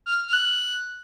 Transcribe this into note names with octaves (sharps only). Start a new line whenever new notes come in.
F6
F6
F#6